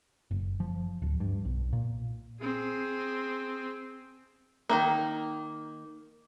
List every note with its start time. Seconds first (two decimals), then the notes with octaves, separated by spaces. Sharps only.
0.31 F#1
0.60 F3
1.02 D1
1.20 G2
1.45 B1
1.73 A#2
2.41 C4 G#4
4.69 D#3 E3 A#3